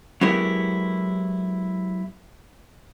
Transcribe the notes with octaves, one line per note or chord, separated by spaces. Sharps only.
F#3 G#3 B3 E4 G4 A#4